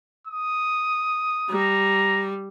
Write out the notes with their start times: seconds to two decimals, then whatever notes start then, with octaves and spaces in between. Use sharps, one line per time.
0.27 D#6
1.49 G3 A#5